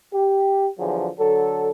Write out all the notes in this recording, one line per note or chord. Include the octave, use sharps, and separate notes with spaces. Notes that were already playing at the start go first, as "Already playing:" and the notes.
G4
E2 D3 F3 F#3 G#4
D3 F#3 A4